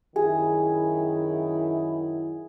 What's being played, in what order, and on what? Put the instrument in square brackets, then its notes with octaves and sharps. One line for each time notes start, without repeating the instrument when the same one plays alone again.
[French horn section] F#2 D#3 E4 [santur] G#4